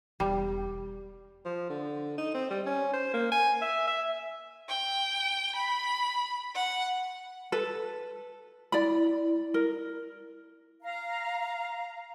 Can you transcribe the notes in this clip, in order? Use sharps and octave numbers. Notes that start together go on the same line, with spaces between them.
E1 G3
F3
D3
D#4
C4
G3
C#4
C5
A#3
G#5
E5
E5
G5
B5
F#5
A4 B4
E4 D5 B5
A#4
F5 A#5